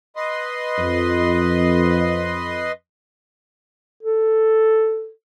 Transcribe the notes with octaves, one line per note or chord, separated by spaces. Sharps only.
B4 D#5 C6
F2
A4